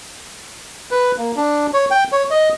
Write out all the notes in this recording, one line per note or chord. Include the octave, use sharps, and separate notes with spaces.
B4
A#3
D4
C#5
G5
C#5
D#5